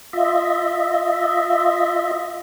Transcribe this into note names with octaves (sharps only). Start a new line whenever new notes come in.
F4 D#5 E5